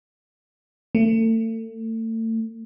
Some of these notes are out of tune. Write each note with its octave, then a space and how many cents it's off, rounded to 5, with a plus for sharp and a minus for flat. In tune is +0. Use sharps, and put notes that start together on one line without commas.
A3 +35